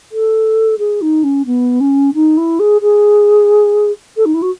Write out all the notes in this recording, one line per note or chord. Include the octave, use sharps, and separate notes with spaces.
A4
G#4
D#4
C#4
B3
C#4
D#4
E4
G#4
G#4
A4
D#4
E4
F#4